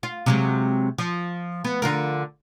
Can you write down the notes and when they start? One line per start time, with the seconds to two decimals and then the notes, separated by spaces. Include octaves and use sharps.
0.03 F4
0.26 C3 F#3 G#3
0.98 F3
1.64 B3
1.82 D3 F4 A#4